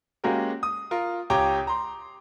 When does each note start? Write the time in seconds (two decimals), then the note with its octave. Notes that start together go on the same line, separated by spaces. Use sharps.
0.24 G#3 A#3 C#4 F#4 G4 A#4
0.63 D#6
0.91 F4 A#4
1.30 C#2 G4 C#5 G5 A#5 D6
1.67 A#5 C6